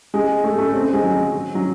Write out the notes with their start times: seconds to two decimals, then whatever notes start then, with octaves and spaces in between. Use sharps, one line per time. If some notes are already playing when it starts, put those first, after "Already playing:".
0.14 G#3
0.44 A3
0.53 G#3
0.58 A3
0.74 C4
0.93 G#3
1.04 F#3
1.55 F#3